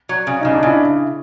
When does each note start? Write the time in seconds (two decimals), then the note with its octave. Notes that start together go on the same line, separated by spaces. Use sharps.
0.09 F#3
0.27 C#3
0.41 D#4
0.45 C#3
0.54 D4
0.63 C#3 E4